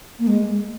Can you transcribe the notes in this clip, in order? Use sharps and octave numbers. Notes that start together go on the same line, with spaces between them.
A#3
G#3